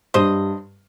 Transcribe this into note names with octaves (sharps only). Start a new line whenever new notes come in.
G2 C5 D#5